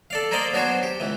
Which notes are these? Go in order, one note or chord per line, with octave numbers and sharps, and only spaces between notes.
A4 D5 F5
A#3 A#4 C5 D5 D#5 F5
F#3 B3 D4 F#4 C5 C#5
G4
C#2 E3